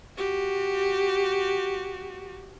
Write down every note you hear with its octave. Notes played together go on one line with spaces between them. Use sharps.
F#4 G4